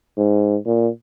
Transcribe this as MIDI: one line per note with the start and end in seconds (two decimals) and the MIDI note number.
0.17 0.56 44
0.66 0.88 46